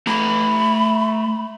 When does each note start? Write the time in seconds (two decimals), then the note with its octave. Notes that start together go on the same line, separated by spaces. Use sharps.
0.07 A3 A#5 B5